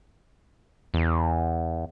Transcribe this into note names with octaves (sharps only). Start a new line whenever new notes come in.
E2